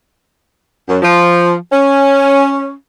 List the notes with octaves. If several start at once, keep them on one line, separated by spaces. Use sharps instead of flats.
F#2
F3
C#4